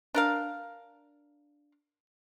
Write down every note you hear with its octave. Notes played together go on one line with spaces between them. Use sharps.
D4 A#4 F5